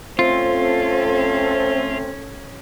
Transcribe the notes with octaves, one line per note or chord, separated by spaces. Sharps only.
A3 C4 C#4 F4 A4